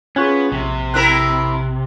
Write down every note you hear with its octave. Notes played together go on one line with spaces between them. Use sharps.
B3 C#4 F4 G#4 C#6 F#6 G#6
A#1 C3
C4 E4 A#4 F#6